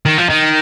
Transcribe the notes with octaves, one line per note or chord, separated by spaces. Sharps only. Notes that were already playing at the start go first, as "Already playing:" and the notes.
D#3
F3
D#3